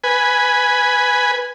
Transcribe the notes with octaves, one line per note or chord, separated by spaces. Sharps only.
B4 G#5